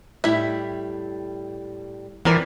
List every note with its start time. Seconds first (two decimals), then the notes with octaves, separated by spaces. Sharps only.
0.24 A2 G3 E4 E5
2.25 G2 E3 F3 C4 A#4 D5